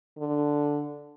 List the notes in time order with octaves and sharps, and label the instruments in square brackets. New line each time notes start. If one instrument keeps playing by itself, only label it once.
[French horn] D3